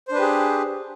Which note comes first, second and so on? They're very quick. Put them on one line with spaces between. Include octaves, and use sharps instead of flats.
C5 D4 B4 G4 G#4